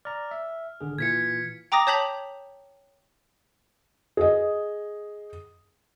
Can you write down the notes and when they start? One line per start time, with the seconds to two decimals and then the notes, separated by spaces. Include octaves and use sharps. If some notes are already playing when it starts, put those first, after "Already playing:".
0.05 D5 A#5 F6
0.31 E5
0.81 G#1 D3 G#4
0.98 A#2 E3 F4 G#6 B6 C#7
1.72 G5 A#5 D6 D#6 A#6
1.87 C#5 A5 G6 B6 F7 F#7
4.17 G#4 D#5